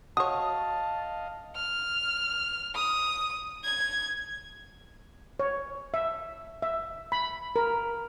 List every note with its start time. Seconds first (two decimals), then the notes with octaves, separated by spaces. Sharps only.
0.17 F#4 C#5 D#5 F5 A5 D#6
1.56 F6
2.75 D#6
3.64 G#6
5.40 C#5
5.94 E5
6.62 E5
7.12 B5
7.56 A#4